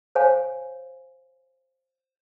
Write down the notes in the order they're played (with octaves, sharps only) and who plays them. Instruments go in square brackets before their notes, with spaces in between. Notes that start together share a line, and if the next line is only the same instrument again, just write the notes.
[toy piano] C5 C#5 F5 G#5